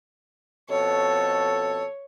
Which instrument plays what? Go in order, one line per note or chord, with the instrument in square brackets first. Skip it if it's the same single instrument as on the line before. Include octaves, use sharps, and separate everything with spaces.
[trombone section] F2 B2 A4 [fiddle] C#5